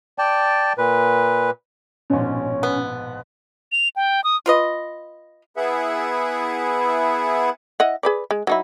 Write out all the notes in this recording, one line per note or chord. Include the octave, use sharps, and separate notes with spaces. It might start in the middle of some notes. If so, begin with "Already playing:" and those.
D5 G5 A5
A#2 B4
A#1 G#2 B2 C#4
B3
F7
G5
D#6
F4 B4 D#5
B3 E4 G#4 B4 E5 F#5
E4 D#5 F#5
G#4 B4 D5
G#3
F#3 D#4 E4